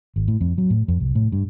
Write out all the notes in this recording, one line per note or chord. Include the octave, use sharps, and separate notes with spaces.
G#1
A2
F2
F#3
A2
F2
C2
A2
G2